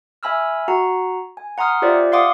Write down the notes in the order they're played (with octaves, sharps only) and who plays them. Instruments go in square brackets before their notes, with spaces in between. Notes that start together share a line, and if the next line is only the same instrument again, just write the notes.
[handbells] E5 G#5 B5 E6 F6
F#4 F#5 A#5
G#5
F#5 A#5 C6 D#6 F6
F4 G4 C5 D5 E5
F5 F#5 C6 D6 D#6